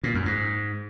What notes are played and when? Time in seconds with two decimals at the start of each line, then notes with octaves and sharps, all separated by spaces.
0.04 A#2
0.15 F#2
0.26 G#2